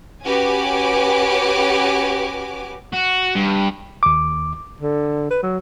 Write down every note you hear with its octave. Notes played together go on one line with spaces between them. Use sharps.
C#4 F#4 G4 B4 G#5 D6
F#4
G2
D#2 D6
D3
B4
F#3